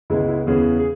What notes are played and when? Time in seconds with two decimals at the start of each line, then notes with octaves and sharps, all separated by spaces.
0.10 C#2 C#3 G#3 B3 E4
0.28 E4
0.46 E2 C#3 E3 B3 G#4
0.79 G#4